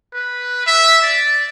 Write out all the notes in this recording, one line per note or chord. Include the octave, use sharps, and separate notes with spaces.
B4
E5
D5